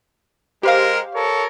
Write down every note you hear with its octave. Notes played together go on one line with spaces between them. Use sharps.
G#3 G4 A#4 C5 F5
A4 A#4 C#5